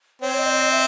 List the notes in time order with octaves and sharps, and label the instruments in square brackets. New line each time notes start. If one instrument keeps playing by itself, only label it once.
[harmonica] C4 [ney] C#5
[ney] D#5
D5
D#5
E5